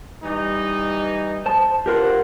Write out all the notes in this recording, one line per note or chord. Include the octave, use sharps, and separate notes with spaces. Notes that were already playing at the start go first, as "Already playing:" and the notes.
E3 G3 D#4
C5 A5
G2 F4 G4 A#4 C5 F#5